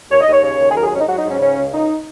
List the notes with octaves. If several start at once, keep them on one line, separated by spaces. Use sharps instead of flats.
D#2 C#5
D#5
D#2 C#5
C#3 C#5
D#2
G#4
F#3 A#4
G#4
G#2 C#4
D#4
F#3 F#4
D#4
G#2
C#4
C#3 C#4
C#2
C#2 D#4